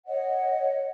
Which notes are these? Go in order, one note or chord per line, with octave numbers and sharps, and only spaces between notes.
C#5 D#5 F#5